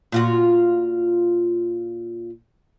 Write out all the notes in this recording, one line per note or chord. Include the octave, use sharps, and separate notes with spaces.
A#2 F4 F#4